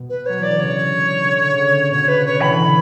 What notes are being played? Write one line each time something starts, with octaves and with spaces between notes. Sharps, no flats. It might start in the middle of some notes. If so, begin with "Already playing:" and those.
Already playing: B2
B4
F#3 C#5
E3 D5
D3
C#3 C#5
D3
C#3
D3
B2 C#5
D3
C#3 B4
D3 C#5
E3 B5
D3
E3